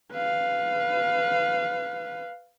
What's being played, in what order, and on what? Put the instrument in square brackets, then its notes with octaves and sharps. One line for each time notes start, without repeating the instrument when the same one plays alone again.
[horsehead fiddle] B4 F5